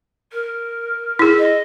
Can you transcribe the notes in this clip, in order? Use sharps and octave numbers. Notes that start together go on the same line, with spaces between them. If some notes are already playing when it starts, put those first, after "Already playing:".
A#4
E4 G#4
D#5